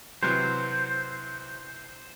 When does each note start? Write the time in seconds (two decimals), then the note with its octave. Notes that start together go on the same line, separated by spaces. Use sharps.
0.23 C3 E3 F#3 C5